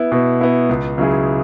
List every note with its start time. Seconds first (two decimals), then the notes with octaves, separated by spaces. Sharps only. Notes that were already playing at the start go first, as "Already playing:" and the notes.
Already playing: B3 E4
0.12 B2
0.41 B3 E4
0.69 C#2
0.98 C#3 F#3 E4 G#4